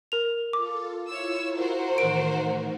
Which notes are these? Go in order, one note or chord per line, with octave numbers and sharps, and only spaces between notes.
A#4 F7
F4 A4 D6
E4 F4 C#5 E6
F#4 A#4 C5
A2 D#3 E3 D7